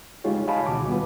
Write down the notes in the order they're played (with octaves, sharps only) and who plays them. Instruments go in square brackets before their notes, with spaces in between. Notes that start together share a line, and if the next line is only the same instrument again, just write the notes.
[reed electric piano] G#3 D#4 F4 G4 G#4 C#5
C#5 D#5 F5 G#5 A5 B5
D2 B2 D#3 F#4 D6
G3 B3 F4 B4